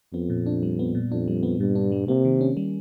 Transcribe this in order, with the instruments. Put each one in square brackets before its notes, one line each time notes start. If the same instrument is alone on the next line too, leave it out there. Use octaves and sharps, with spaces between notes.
[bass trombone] F2 [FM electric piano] B3
[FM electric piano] A#2
D4
G3
B3
A#2
[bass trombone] F2 [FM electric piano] D4
[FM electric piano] G3
B3
[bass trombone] G2 [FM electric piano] A#2
[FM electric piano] D4
G3
[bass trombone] C3 [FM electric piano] A#3
[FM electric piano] D#3
C#4
G3